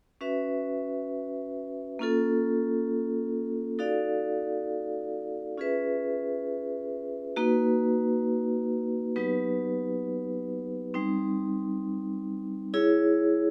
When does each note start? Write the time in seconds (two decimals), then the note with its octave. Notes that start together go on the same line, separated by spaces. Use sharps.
0.21 C#4 F#4 B4 E5
1.99 A#3 C#4 F4 A4
3.79 D#4 F#4 A4 D5 F5
5.58 C#4 F4 G#4 B4 E5
7.37 A#3 D#4 F#4 B4
9.16 F#3 B3 D#4 G4 B4
10.94 G3 C4 D#4
12.74 E4 G#4 C#5